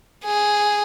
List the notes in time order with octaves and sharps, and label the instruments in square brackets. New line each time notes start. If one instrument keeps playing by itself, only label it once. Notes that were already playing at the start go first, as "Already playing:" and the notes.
[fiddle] G#4